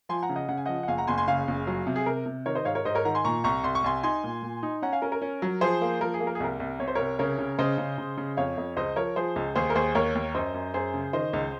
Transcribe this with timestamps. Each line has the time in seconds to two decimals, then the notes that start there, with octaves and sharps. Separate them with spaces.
0.09 F3 G#5 C6
0.23 F#5 A#5
0.29 C#3
0.36 D#5 F#5
0.49 C#3 F#5
0.57 G#5
0.66 F3 D#5 F#5
0.83 F#5
0.88 F#1 F5 G#5
0.98 F#5 A#5
1.07 F#1 G#5 C6
1.18 G#5 C6
1.28 C#3 F5 G#5
1.48 F#1
1.67 F#3
1.87 C3
1.96 G#4
2.06 C3 A#4
2.26 C3
2.46 D#3 A#4 C#5
2.55 C5 D#5
2.65 G#2 C#5 F5
2.75 A#4 C#5
2.85 G#2 C5 D#5
2.95 A#4 C#5
3.05 D#3 F#5 A#5
3.15 G#5 C6
3.25 A#2 A#5 C#6
3.44 C2 A#5 C#6
3.64 C2 C6
3.75 C#6
3.84 C2 G#5 C6
4.03 D#4 G#5 C6
4.24 A#2
4.43 A#2
4.63 D#4
4.82 C#4 F#5 A#5
4.93 F5 G#5
5.02 C#4 A#4
5.12 A#4
5.22 C#4
5.42 F#3
5.61 F3 G#4 C5
5.81 A#3
6.01 F3 A#4
6.14 G#4
6.20 A#3
6.27 A#4
6.35 G#4
6.40 C2 A#4
6.60 C2
6.80 C3 C#5
6.88 C5
6.95 C2 A#4 C#5
7.19 C#3 A#4 C#5
7.39 C#3
7.59 C#3 C5 D#5
7.78 C#3
7.98 C#3
8.18 C#3
8.37 F2 C#5 F5
8.58 F2
8.77 C#2 C5 D#5
8.96 F3 A#4 C#5
9.16 F3 G#4 C5
9.36 C#2
9.56 D#2 G#4 C5
9.70 A#4
9.75 D#2 G#4 C5
9.95 D#2 A#4 C#5
10.15 D#2
10.35 F#2 C5 D#5
10.54 F#2
10.74 F#2 G#4 C5
10.94 C#3
11.13 D#3 C5 D#5
11.33 C#2